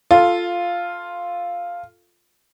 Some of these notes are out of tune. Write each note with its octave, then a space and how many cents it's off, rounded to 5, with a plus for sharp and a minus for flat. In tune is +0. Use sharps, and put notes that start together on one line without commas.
F4 +0 A4 +0